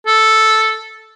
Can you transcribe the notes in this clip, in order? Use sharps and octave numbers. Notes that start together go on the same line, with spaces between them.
A4